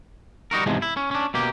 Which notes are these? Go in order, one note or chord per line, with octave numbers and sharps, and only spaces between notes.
G3 D#4 F#4 A#4
E2 G#2 C3 F3 G#3
E4
C#4
C#4 D4
B2 A#3 G4